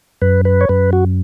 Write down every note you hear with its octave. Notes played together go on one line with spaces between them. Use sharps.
F#2 B4
B4
C#5
F#2 B4
F#4